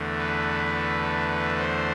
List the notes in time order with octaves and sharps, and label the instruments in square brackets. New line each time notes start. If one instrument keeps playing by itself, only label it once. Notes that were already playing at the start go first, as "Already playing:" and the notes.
Already playing: [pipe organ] E2 D3 A3
B4
C5